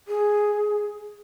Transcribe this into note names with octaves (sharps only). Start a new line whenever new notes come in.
G#4